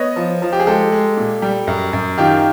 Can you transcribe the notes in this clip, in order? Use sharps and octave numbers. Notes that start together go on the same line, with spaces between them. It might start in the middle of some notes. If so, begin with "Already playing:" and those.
Already playing: B3 C#5 D#5
F3
F3
G4
G#4
G#3 G4 A4
G#3
A#2
G3
F#2
F#2
D#3 F4 G4